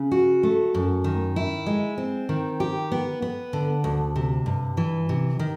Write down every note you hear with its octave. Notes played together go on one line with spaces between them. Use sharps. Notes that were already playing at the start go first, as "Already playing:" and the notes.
Already playing: C#3
F#4
A3
F#2
D#3
E4
G#3
C4
D#3
G4
B3
B3
D3
D2
C3
G2
E3
C3
D#3